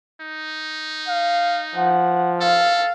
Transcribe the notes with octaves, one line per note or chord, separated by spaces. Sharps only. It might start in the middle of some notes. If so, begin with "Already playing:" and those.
D#4
F5
F3 F#5
A4 F5